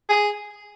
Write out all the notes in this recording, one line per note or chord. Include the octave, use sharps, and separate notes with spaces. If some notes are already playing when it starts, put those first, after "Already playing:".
G#4